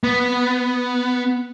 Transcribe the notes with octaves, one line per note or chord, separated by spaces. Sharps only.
B3